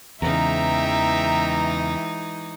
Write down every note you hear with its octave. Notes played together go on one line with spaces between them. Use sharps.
E2 C#3 E3 G#3 D#4 E5 G5 A#5